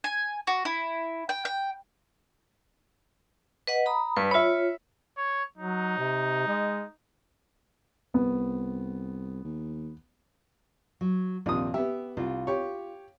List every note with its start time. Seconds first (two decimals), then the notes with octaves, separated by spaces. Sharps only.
0.04 G#5
0.47 F#4
0.65 E4
1.29 G5
1.45 G5
3.67 B4 D#5 F#5
3.86 A#5 B5 D#6
4.17 G2 B4
4.31 F4 C#5 E5 B5
5.18 C#5
5.58 F#3 D#4
5.98 C3
6.47 G#3
8.14 C2 B3
9.44 D#2
11.01 F#3
11.46 A#1 D#2 C3 F4 D#6
11.74 B3 G4 E5
12.17 C2 F4
12.47 G4 C#5